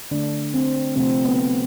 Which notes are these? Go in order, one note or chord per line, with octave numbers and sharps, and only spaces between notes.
D3 A3 D4
C4
C3 F3 A3 C4
B3